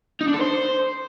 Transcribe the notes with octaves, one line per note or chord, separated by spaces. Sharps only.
D#4
D4
A4
C5